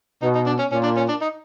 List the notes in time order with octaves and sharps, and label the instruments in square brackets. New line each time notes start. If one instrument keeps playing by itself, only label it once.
[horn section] B2 [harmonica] D#4
[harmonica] D#4
D4
C#4
[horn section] A#2 [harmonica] C#4
[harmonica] D4
C#4
D4
D#4